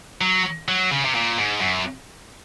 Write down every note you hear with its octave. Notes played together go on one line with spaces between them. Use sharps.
F#3
F#3
C#3
C3
A#2
G#2
F#2